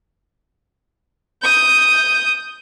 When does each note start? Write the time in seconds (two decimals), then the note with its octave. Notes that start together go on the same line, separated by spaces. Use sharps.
1.42 D#6 G6